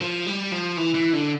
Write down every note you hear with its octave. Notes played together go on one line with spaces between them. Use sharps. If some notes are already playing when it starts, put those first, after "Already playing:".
F3
G3
F3
E3
E3
D3